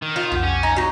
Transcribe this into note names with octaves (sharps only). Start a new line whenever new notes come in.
D#3
F4
B1 F2 G4 F#5
C#4
D#4 G#5
F#3 D#4